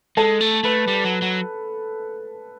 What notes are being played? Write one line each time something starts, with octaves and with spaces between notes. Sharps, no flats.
G#3 A4
A3
A3 B4
G3
F#3
F#3